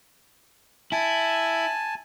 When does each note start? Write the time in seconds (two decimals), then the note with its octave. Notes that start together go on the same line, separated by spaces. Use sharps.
0.92 E4 G#5 A5